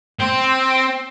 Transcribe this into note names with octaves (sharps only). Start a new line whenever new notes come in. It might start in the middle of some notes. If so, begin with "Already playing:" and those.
C4